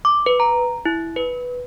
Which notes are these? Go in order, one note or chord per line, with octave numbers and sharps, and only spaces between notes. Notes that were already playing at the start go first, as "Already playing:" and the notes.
D6
B4
A#5
E4
B4